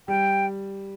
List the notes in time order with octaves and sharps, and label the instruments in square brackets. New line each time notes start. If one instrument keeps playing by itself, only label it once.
[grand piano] G3 [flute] G5